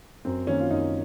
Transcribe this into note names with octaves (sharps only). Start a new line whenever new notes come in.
F#2 C4
D#3 A#3 C#4
F4
F#2 D#4